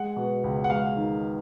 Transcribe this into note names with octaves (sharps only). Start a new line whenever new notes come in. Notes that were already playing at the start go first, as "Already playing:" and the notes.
Already playing: G#3 F#5
B2
C#2
F#5
G#3 F5
D#3